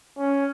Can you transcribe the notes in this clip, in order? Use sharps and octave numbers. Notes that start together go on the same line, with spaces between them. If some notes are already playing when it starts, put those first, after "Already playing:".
C#4